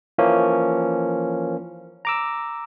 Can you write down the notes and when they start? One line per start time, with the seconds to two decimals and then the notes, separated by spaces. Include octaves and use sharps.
0.18 E3 F3 A#3 C#4
2.05 A#5 D6 E6